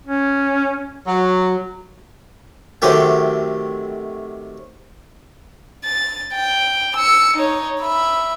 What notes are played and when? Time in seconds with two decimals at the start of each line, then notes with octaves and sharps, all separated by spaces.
0.07 C#4
1.07 F#3
2.82 C3 D#3 F#3 A3 G4 G5
5.85 A6
6.34 G5
6.96 E6 C#7
7.36 D#4 C#5
7.80 E5 B5